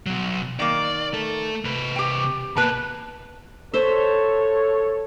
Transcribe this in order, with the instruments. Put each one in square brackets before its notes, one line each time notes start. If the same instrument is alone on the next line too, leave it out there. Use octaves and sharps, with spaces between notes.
[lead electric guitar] B2 F#3
[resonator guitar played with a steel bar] D#3 A#3 [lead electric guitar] D5
[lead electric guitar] A3 A4
C3 B4
[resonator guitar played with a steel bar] G4 G5
[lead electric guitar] B2 A#3 [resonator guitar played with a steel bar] B4 A5
[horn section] A4 C#5 [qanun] C5 E5